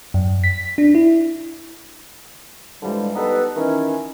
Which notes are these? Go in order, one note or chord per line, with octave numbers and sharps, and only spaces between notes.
F#2
B6
D4
E4
G2 D3 E3 F3 G3 G#3
G3 B3 D#4 A4 B4
D#3 E3 C#4